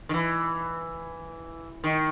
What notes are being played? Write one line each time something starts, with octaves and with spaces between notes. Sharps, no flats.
D#3
E3
D#3